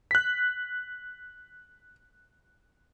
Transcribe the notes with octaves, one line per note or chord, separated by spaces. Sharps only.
F#6 B6